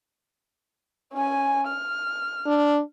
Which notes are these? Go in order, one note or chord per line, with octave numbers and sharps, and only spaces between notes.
C#4 G#5
F6
D4